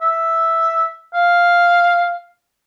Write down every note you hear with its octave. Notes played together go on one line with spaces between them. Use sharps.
E5
F5